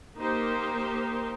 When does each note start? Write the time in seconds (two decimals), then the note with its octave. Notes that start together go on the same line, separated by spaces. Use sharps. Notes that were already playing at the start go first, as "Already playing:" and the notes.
0.18 A#3 D#4 G4 C5